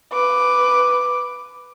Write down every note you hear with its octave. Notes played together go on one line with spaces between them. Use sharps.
B4 D6